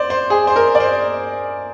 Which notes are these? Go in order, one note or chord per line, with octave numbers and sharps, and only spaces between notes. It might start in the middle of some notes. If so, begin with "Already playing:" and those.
Already playing: C5 D5
C5
G#4
C5
A#4
D5
C5